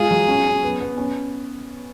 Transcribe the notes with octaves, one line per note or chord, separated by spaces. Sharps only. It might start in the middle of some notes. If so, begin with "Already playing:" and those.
Already playing: G#3 F4 G#4
F#3
C#4
C#4
B3
B3
C#4